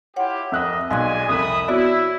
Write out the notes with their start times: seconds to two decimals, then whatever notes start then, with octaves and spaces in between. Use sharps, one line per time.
0.16 E4 F4 G4 C#5 F#5
0.52 F2 A#4 D#5 E5 F#6
0.91 B1 G#3 D5 F5 G#5 C6 F#6
1.29 C2 F2 E5 B5 D#6
1.68 B3 E4 F#4 C#5 D5